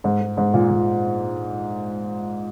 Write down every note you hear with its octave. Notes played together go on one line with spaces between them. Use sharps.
G#2
G#2
G#2
A#2
A#2